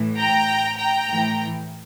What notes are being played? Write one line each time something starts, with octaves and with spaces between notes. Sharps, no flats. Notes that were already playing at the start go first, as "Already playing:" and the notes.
Already playing: A2 E3
G5 A#5
G5 A#5
A2 E3